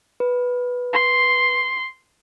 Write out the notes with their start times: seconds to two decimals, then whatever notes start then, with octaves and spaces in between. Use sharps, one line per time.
0.20 B4
0.93 C6